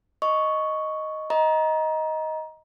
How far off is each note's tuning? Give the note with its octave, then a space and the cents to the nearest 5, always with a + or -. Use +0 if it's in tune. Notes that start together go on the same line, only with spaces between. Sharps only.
D#5 +0 C#6 +0
D#5 +10 A#5 +20